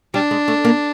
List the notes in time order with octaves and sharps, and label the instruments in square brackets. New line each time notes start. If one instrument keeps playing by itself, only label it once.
[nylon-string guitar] G3 [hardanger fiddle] D4
[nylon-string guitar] G#3
A3
A#3